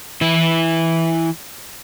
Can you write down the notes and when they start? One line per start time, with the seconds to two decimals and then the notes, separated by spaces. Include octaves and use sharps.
0.21 E3 E4